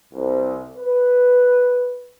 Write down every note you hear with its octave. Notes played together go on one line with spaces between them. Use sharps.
C2
B4